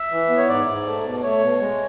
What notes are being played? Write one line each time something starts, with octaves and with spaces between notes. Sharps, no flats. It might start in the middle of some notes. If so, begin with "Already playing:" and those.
Already playing: E5
E3
B3
C#5
G#2 D5
G#2
A3
B2
A3 C#5
B2
G#3